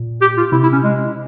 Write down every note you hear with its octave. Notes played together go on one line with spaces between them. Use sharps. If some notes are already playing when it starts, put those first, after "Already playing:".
Already playing: A#2
G4
F4
C3 E4
E4
C#4
G#3